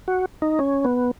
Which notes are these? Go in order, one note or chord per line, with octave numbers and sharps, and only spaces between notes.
F#4
D#4
C#4
B3